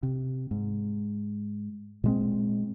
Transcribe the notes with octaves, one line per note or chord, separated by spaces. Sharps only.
C3
G#2
A#2 G#3 C4